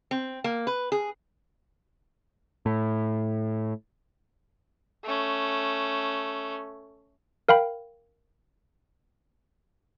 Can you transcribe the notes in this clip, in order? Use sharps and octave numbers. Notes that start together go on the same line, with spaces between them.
C4
A#3
B4
G#4
A2
A3 C#4
A#4 F5 G5 B5